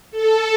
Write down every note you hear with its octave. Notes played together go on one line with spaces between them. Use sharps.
A4